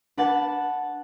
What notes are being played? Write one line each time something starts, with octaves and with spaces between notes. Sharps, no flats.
D4 B4 F#5 A5 F#6 A6